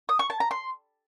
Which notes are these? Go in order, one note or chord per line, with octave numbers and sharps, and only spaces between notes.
D#6
C#6
A5
A#5
C6